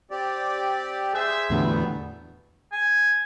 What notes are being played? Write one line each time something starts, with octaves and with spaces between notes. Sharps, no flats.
C4 G4 D5
G#4 C5 E5
E2 A2 D3 F#3 G3 B3
G#5